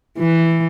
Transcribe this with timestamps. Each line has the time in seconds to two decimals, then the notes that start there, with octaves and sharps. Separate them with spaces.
0.19 E3